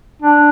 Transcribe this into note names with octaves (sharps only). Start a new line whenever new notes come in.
D4